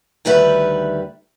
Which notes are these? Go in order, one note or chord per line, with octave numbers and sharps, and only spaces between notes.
D2 D#3 G3 B4 E5 F#5